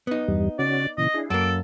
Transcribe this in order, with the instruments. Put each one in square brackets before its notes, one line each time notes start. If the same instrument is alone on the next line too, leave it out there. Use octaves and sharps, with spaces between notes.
[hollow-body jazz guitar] B3 D#4
[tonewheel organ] E2 G2 G3
[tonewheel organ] C#3 C#4 F#4 [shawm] D5
[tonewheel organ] A#2 C#3 E3 [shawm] D#5
[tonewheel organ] D4 E4 G#4
[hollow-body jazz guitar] F#2 A#3 [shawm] A4 [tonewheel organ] D6